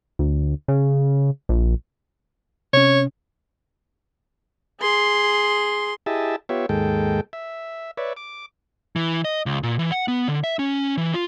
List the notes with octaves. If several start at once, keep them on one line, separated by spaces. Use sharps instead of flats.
D2
C#3
A#1
C3 C#4 C#5
G#4 C6
E4 G4 G#4 D#5 E5 A5
B3 F4 G4 C#5 E5
D#2 G#2 G#3 A4 G5
E5
B4 C#5 D5 E5
D6
E3
D#5
C#2
A#2
E3
F#5
B3
D3
E5
C#4
E3
F4